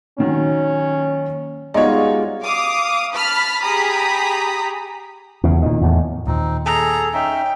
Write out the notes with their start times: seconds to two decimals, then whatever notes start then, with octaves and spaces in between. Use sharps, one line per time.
0.18 A#2 D#3 F#3 C#4
1.74 G3 G#3 B3 D#4 F4 F#4 C#5 D5
2.43 F5 D6 D#6
3.13 A5 B5 F6 B6
3.62 G4 G#4 A#5 B5 D#6 B6
5.43 E2 C#3
5.62 A#2 D#3
5.81 E2 A2
6.27 D#2 A#2 C4 D#4
6.66 G#4 A4 A#5
7.14 C#4 D#4 E5 G5